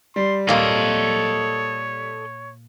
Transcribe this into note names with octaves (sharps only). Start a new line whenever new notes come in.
G3 C6
A#2 A#3 A4 C#5 D#5